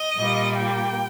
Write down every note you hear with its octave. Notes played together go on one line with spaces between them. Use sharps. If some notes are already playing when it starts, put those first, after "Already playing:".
Already playing: D#5
A#2 G3 A#3
G5